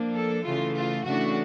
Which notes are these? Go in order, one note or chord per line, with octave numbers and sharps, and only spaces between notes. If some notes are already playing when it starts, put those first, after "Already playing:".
Already playing: F3 A#3 D4
A4
C#3 E3 A3 F4
F4
C#3 E3 A3 D4 F#4